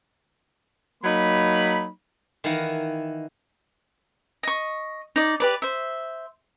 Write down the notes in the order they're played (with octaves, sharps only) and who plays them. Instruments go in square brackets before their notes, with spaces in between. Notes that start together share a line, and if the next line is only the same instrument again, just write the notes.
[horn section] F#3 A#3 D#4 B5
[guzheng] D#3 E3 E4 F5 F#5 A#5
[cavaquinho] D#5 C#6
D#4 D5
G4 B4 D5
C5 E5